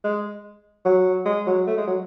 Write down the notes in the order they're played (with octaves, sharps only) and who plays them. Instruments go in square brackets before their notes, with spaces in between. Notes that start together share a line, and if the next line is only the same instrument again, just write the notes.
[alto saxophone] G#3
F#3
G#3
F#3
A3
G#3
F#3